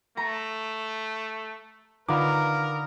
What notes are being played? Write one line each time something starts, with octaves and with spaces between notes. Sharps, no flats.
A3 A#5
D3 D#4 F4 A#4 B4 D6